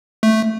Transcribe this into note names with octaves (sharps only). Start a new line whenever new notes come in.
A3